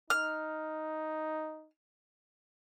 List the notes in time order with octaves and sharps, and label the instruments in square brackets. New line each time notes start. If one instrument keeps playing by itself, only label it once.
[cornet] D#4 [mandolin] F6